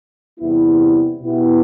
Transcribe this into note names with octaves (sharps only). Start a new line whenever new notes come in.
E2 C3 G3 B3 E4
B2 B3 E4 G4